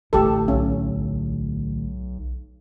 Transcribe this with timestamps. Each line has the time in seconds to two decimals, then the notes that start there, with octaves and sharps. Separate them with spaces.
0.13 A1 D2 G4 A4
0.48 B1 C#4